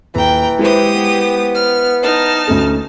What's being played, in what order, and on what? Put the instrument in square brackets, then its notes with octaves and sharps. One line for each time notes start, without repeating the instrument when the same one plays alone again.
[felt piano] D#1 [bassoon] E3 [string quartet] G5 A#5
[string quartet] G#3 G4 D#6 [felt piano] E4 B4 C5
[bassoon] B3
[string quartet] F6
D#4 A5 F6
[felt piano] D2 C#4 A4